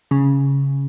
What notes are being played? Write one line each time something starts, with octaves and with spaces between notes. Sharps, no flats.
C#3